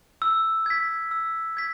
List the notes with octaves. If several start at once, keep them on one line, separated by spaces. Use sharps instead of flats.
E6
G#6 B6
E6
G#6 B6